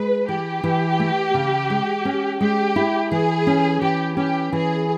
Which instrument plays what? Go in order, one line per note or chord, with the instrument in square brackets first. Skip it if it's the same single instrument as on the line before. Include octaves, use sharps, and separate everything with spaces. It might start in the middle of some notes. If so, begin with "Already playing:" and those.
Already playing: [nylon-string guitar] G#3 [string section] B4
[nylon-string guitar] E3 [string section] G4
[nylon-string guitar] E3
A3
C#3
G#3
C#4
[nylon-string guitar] G#3 [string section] G4
[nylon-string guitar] E4
[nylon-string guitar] E3 [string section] G#4
[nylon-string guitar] C#4
[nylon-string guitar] E3 [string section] G4
[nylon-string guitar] C#4 [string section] G4
[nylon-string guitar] E3 [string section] G#4